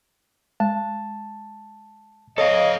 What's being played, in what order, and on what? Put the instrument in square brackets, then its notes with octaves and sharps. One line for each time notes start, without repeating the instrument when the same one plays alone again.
[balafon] G#3 [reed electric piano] A5
[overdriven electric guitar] A4 F5 [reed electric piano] C#5 [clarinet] D#5